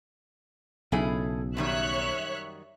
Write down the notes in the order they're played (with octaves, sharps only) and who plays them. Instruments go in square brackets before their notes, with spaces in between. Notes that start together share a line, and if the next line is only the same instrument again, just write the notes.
[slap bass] B1 C#3 [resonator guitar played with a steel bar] E4 G#4 A4
[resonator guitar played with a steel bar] F#2 D#3 G3 [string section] C#5 E5 F#6